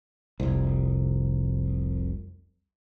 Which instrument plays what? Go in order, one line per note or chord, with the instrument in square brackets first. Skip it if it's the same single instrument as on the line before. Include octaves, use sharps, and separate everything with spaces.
[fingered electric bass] F1 C2